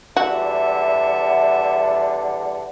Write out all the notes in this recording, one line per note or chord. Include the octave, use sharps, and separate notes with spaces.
E2 D3 G3 F#4 E5 F#5